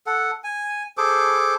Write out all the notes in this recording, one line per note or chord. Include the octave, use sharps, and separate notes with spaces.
A4 F#5
G#5
G#4 A4 C5 D6